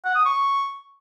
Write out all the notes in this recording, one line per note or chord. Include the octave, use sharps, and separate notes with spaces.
F#5
D#6
C#6